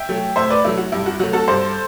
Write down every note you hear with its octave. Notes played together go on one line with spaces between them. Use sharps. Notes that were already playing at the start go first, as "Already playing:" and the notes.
Already playing: E5 G5
F#3 A3
A2 C5 E5
B4 D5
F#3 A3 E4
F#4
G2 E4
F#4
F#3 A3 F#4
F#4 A4
G2 A4 C5